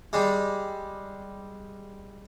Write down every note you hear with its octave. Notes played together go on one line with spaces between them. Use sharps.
G3 G#3